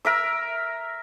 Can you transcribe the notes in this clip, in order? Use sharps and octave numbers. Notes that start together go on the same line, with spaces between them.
A#4 E5 E6